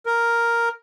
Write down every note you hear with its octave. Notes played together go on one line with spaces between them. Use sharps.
A#4